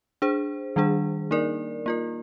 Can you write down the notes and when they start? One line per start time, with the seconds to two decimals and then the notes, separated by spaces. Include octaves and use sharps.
0.22 D4 G#4 C5
0.76 D#3 G3 D4 G#4
1.31 A#3 D#4 A#4 D5
1.86 A#3 F4 A#4